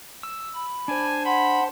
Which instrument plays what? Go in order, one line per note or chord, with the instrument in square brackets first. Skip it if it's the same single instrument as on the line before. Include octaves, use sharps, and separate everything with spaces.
[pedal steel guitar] E6
[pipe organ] B5
[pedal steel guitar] D4 [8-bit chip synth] C5 A5 [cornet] G#5
[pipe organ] F#5 C6 [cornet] B5